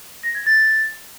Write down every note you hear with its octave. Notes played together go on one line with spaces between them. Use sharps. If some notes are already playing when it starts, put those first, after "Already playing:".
A#6
G#6
A6